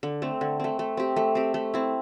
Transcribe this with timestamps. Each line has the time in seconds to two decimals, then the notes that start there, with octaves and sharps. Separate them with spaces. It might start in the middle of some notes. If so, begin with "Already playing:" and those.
0.03 D3
0.22 A3 C4
0.41 D3
0.60 A3 C4
0.79 A3
0.97 C4 G4
1.16 A3
1.35 C4 G4
1.54 A3
1.74 C4 E4